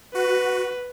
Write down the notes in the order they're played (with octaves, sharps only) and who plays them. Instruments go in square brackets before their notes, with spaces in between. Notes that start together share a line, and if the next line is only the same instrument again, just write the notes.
[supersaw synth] F#4 [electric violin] B4